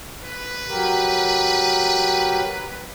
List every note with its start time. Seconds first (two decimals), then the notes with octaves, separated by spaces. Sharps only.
0.23 B4
0.68 F#3 G4 A#4